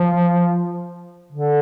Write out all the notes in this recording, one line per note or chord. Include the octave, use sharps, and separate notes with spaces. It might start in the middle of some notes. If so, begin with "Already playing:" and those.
Already playing: F3
D3